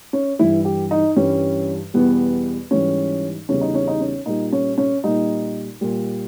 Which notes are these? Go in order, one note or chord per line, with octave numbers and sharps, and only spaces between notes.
C#4
G2 E3 G3 E4
G4
D#4
G2 E3 G3 C#4
E2 B2 G3 B3
G#2 E3 G3 C#4
E2 C#3 G3 C#4
D#4
C#4
D#4
C#4
A#2 G3 D#4
C#4
C#4
A#2 G3 D#4
A#2 G3